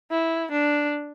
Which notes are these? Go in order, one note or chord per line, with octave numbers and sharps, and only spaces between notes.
E4
D4